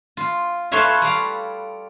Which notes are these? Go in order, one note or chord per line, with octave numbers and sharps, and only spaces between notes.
F4
F4 A4 B4 C#5 E5 F5
G3 F5